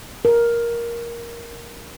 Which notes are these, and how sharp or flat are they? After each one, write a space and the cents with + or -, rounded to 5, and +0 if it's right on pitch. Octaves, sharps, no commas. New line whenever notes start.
A#4 +10